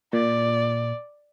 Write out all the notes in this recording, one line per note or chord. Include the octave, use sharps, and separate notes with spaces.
A#2 D5